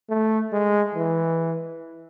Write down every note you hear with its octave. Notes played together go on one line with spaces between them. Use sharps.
A3
G#3
E3